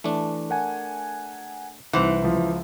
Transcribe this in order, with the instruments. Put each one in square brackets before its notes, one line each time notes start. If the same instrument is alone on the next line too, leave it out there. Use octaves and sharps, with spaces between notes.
[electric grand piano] E3 [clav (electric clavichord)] A3 D4
[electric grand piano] A#4 F#5 G#5
[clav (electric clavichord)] C2 C5 F#5 [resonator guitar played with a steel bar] E3 [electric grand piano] D#4
[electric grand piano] C#2 F3